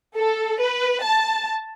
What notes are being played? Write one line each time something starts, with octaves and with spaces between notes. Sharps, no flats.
A4
B4
A5